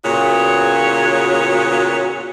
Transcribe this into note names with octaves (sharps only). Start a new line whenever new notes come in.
E2 A#2 C#3 F#4 C#5